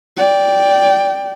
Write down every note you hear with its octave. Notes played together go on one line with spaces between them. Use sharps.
D5 G5